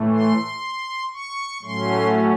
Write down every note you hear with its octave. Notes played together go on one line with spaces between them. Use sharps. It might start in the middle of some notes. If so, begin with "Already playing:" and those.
Already playing: A2 E3 A3
C6
C#6
A2 F#3 A3 C#4 C6